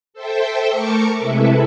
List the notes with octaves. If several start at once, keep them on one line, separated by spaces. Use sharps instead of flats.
A4 C5 E5 G5
A3 A#4 A5 C#6 D6 C#7
C3 G#3 E4 A4 B4 E5